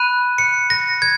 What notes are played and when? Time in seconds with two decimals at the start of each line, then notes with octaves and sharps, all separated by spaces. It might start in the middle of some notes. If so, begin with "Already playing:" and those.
Already playing: B5 F#6 D#7
0.38 C#7
0.70 A#6
1.02 G#6